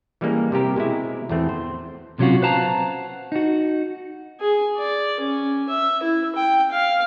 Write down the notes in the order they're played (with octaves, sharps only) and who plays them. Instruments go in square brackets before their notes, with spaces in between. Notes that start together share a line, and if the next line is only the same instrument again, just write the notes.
[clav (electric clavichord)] E3 G3 G#3 A#3 C#4
C3 G3 G4 A#4
B2 G#3 C4 E4
E2 A2 E3 A3 C4
C5
[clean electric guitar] B1 C3 F#3 C#4 F4 F#4
B4 C5 F5 F#5 A5 A#5
D#4 F#4
[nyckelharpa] G#4
D5
C#4
E5
E4
G5
F5